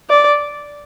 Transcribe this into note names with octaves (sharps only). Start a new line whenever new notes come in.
D5